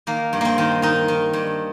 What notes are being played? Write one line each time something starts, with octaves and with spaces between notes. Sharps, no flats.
D#3 A#3
G2
A#3 C4
D#3
D#3 D#4
D#3
G2